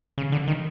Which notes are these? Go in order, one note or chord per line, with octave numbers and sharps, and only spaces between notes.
C#3
D3
D#3